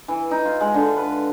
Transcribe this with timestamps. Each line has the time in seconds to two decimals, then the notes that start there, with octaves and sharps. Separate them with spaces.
0.08 E3
0.31 D#4
0.45 F4
0.61 G#3
0.74 D3
0.97 B4